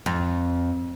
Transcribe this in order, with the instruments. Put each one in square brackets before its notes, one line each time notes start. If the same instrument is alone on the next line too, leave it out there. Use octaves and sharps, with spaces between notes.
[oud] F2